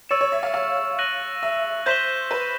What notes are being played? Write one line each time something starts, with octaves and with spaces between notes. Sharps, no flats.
C#5 C#6 E6 A6 C#7 E7
C#5
E5
F5
F5
F#6 A#6 D#7 F#7
E5
C5 G6 B6 E7 G7
B4